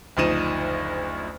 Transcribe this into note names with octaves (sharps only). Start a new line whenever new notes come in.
F#1 D2 F3 D#4 D#7 E7